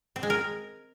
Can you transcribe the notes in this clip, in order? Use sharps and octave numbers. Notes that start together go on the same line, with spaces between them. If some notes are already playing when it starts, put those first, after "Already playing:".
C4
G#3
A#4